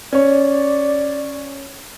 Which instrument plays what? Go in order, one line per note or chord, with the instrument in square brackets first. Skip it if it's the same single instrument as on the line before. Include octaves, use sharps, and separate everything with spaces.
[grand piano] C#4 C#5 [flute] D5